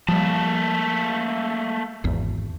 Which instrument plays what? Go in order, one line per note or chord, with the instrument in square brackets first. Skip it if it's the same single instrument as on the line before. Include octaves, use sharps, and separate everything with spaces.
[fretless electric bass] F3 G3 [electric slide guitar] A3 A#3 A5
[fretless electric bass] G#1 E2